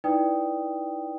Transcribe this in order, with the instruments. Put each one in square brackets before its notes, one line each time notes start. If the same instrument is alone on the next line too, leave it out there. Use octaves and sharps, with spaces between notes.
[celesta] D#4 E4 B4 D5 G5 D#6